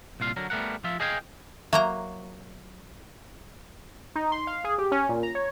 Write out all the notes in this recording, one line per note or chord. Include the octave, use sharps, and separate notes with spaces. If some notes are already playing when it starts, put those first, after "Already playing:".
C2 A#2 F4 F5
D3 F#3 A#4
G3 A3 B3 A#4 F#5
F3 F4 E5
G#4 D#5 F5 G5 G#5
F#3 A#3 E5 A#5
D#4
C6
F5
G#4
G4
C#4
A#2
A#5
C#5